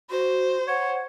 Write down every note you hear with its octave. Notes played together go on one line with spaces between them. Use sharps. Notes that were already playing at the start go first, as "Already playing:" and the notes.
F#4 C5
C#5 F#5